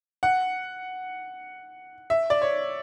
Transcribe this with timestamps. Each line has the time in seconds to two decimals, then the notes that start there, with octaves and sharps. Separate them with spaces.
0.23 F#5
2.10 E5
2.30 D5
2.42 C#5